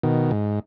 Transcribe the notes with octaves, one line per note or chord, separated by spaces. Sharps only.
B2 D#3
G#2